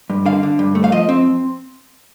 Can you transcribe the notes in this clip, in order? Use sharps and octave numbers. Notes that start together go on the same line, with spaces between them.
G2
D3 F5
D3
G2
A3
F5
F3 D#5
C4